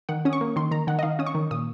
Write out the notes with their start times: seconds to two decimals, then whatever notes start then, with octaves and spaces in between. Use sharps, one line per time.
0.09 D#3 F#5
0.25 C#4 D#6
0.33 C#6
0.41 A#3
0.56 D#3 C6
0.71 D#3 A#5
0.87 D#3 F#5
0.99 D#5
1.03 D#3 F5
1.19 C#4 D#6
1.26 C#6
1.35 D#3
1.51 A#2 D#6